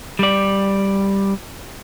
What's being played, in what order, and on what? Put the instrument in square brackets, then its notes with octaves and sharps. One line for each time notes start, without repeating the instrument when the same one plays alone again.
[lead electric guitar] G3 D5